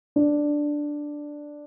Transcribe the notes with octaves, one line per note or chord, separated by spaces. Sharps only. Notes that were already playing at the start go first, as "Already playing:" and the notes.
D4